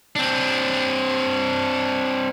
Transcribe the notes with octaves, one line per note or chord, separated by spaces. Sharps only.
C4 D4